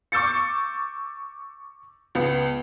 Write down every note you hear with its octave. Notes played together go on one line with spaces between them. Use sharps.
C#6 D6 E6 G6 A6 C#7
C#2 B3